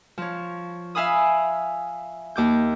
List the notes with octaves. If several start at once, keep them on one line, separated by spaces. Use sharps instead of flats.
F3 C#5
E5 F5 G#5 B5 D#6
D#2 D6 G6